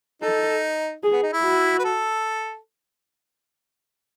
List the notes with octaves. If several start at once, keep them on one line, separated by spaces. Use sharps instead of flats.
D#4 A4
G#4
B3
D#4
E4
F#4
B4
A4